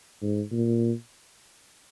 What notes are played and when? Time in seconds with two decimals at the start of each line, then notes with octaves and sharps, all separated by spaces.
0.22 G#2
0.52 A#2